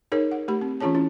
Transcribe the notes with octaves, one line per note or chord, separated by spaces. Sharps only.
D#4 G#4 A#4 C#5
F#5
A3 G4 B5
C4
E3 C#4 F4 G#4 C#5 A5
C#4 E4